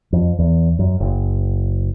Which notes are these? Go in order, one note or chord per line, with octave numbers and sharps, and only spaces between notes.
F2
E2
F#2
F#1